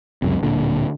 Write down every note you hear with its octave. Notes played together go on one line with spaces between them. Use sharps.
C#2 F#2 C3
D1 A#2 D3